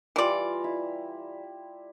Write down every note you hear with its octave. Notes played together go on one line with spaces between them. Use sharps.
E3 G3 F4 D5 A#5
E4